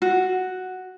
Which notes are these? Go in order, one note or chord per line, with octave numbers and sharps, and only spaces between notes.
F#4